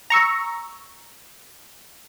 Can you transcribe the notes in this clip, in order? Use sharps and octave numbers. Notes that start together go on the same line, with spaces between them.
A#5 C#6 E6